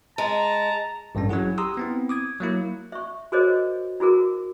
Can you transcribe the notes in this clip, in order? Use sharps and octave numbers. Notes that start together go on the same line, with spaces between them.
G#3 A5 A#5
A1 G2 G3 C#4
F#3 C#4 E4 G#4 F#5
G4 A#5 C6 D#6 E6
B3 C4 E4
D6 D#6 G#6
F#3 A#3 E4
E5 C#6
F#4 G#4 A#4 C5 C#5 D#5
E4 F#4 G#4 A#4